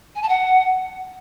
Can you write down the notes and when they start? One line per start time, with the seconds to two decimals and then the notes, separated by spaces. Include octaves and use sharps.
0.15 G#5
0.22 A5
0.28 F#5